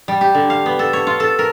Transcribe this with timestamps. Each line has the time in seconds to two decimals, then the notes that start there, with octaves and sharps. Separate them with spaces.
0.08 G3
0.21 G4
0.35 D3
0.50 F5
0.66 B3
0.79 A4
0.93 C#5
1.07 F4
1.20 A4
1.39 A#4